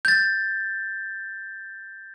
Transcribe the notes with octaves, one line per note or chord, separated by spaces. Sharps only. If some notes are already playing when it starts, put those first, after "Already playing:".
G6 A6